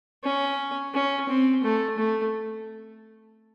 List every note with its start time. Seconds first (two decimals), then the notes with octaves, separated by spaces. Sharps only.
0.24 C#4
0.94 C#4
1.29 C4
1.64 A3
1.98 A3